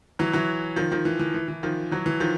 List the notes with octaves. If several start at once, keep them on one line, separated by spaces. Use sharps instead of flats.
E3 F#3
E3 F#3
D#3 F3
D#3 F3
E3
E3
E3
E3
D#3 F3
E3 F#3
E3
D#3 F3